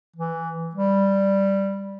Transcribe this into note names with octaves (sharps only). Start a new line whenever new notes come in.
E3
G3